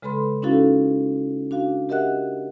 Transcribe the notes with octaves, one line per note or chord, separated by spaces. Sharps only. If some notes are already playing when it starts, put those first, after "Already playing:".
C#3 G#3 A4 B4 B5 C6
C#4 D#4 E4 F#4 A4 F5
D4 F#4 F5
G4 A#4 D#5 E5 F#5 F#6